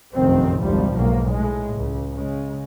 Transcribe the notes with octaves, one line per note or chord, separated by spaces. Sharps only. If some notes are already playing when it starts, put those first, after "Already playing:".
F1 A#1 F#2 D#3 C4
G#1 D2 F3 G3
B1 G#2 A#3
A2 G#3
C#2
C#3 G#3